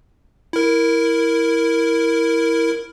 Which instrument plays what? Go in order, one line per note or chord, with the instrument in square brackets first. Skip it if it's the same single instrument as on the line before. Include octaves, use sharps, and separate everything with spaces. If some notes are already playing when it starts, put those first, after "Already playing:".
[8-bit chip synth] E4 A#4